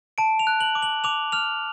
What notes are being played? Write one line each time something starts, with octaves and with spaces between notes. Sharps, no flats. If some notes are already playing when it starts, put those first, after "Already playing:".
A5 D7
F7
F#6
F#7
D6
F#7
D6 F7
F6 F7